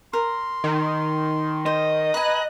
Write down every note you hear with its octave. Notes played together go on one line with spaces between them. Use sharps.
A#4 C6
D#3
C5 D#5
B4 G#5 A#5 F#6